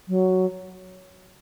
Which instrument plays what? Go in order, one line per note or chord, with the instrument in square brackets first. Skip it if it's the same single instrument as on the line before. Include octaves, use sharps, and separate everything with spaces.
[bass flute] F#3